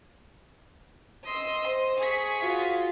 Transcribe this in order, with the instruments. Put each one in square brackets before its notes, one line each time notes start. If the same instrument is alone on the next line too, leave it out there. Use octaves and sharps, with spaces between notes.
[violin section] D#5 [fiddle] C6 E6
[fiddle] C5
[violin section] G#4 C#6 B6
[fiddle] F4 F#4